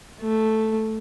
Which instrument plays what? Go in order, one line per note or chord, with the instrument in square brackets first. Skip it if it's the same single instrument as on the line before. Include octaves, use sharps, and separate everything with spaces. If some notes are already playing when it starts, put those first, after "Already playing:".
[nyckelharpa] A3